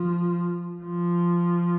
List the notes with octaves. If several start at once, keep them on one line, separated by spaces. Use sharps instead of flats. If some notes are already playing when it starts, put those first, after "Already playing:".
Already playing: F3
F3